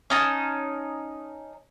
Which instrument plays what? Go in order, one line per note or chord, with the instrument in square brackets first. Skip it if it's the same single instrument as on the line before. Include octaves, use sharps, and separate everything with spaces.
[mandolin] C#4 D#4 A5